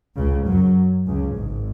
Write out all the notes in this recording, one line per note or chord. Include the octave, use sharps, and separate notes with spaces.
C#2 C#3
F#2 F#3
C#2 C#3
G#1 G#2